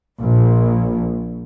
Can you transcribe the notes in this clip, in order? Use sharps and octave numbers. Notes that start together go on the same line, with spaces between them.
A#1